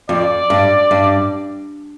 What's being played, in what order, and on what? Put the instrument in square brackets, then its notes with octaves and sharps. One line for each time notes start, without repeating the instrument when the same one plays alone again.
[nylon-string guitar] F2 [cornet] D5
[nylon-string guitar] G2
G2